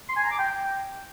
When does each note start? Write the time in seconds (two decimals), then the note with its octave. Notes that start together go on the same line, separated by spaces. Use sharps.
0.09 C6
0.17 G#5
0.24 A#5
0.31 D6
0.39 G5